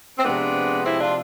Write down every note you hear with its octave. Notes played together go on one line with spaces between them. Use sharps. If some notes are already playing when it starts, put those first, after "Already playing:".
C4
C3 F3 G#3 B3 D4
C4 E4
D4 F4